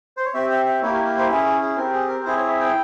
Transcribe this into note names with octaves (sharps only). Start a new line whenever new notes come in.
C5
C#5
C4 G4 E5
E5
E5
A#3 E4 G4 C#5
A#4
A#4
C5
C#4 E4 G#4 E5
C#5
G#4
C4 G4 A#4
G#4
A#4
C4 E4 G#4 C5
C#5
E5
G5